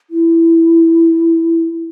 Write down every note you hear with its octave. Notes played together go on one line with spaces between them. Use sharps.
E4